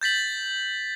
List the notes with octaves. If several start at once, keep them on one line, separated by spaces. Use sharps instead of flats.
G6 A6 B6 F#7